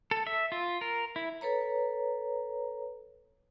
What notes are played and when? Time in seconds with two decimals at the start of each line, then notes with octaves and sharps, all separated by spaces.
0.11 A4
0.27 E5
0.52 F4
0.81 A#4
1.16 E4
1.41 A4 B4 C#5 A#5